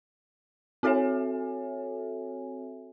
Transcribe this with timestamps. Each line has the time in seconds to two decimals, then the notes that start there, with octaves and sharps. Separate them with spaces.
0.83 C4 F#4 A4 C#5 E5 G#5